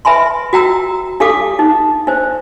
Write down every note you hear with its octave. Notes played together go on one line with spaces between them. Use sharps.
B4 E5 G#5 B5 C6
F#4 G5 A#5 E6
D4 G4 A4 F5 D6 D#6
D#4
D4 C5